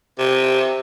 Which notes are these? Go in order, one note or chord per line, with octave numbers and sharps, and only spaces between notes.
C3